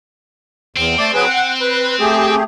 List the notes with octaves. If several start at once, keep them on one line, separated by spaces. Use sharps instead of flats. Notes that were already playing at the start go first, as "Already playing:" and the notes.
E2 C4
A3 C4 D5 D6
F#3 G#4 B4
F#5
B4
A3 G4 G#4